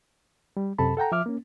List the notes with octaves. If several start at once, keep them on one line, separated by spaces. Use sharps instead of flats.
G3
F#2 C3 A4 A5 B5
A4 F#5 G5 A#5
F3 E5 D6 F6
A#3 C#4